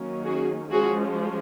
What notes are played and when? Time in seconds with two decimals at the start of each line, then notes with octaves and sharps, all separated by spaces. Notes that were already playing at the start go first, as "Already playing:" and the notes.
Already playing: D#3 F#3 A#3 C#4
0.25 F#4 G#4
0.71 F3 G#3 C#4 F#4 G#4